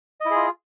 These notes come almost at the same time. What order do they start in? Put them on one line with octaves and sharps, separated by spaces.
D#5 E4 G#4 F4